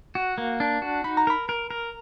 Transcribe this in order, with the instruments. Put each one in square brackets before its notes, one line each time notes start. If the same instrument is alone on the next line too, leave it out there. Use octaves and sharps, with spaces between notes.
[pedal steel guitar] F#4
A#3
D4
F#4
[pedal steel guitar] D#4 [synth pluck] B5
[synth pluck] A#5
[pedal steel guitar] A#4 [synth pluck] B5
[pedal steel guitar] A#4
A#4